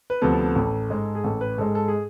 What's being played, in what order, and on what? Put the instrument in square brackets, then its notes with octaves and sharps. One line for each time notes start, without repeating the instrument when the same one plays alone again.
[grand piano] B4
D2 C3 F3 B3 A4
A1 A4
G#2 G#3
G#4
A1 A4
B4
G#2 G#3 A4
A4
G#4